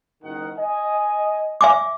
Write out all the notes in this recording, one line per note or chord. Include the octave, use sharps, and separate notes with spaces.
F#1 D#3 F#5
D#5 G#5
E5 G#5 D6